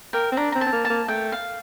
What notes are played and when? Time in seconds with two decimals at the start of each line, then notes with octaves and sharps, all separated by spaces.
0.13 A#4 G5
0.32 C4
0.37 D4 A#5
0.52 C4 A#5
0.61 A5
0.67 C4
0.72 A#3
0.85 A5
0.90 A#3
1.08 A3 G5
1.32 F5